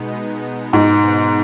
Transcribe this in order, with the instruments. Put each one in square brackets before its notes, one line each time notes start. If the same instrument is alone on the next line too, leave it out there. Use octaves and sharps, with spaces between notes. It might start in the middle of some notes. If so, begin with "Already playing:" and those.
Already playing: [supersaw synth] B2 G#3 B3 D#4
[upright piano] G#2